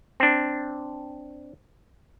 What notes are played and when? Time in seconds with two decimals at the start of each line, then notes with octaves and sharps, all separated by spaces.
0.20 C4 D4